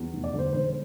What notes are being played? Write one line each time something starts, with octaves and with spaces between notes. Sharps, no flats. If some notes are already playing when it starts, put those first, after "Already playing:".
Already playing: E2
F1
D5
D3 C5
E1 C5